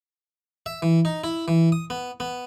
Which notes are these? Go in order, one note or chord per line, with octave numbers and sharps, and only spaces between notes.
E5
E3
D#4
E4
E3
D#6
B3
B3